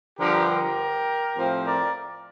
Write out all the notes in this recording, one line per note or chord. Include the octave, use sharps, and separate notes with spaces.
G2 D3 F3 G4 A#4
G4 A#4
A2 F3 C4
A#4 D5